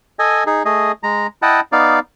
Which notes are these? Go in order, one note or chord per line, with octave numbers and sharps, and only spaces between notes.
A4 D#5 G#5
D#4 G#4
A3 G#4 D#5
G#3 A#5
E4 D#5 F#5 G5 A5
B3 D#4 D5 F5